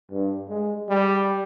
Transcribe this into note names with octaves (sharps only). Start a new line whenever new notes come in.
G2
G#3
G3